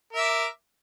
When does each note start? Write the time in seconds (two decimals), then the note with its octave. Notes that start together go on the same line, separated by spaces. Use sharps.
0.13 A#4
0.16 E5
0.20 D6